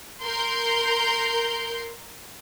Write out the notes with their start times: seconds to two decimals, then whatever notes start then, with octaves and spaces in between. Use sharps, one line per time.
0.23 A#4 C6 G6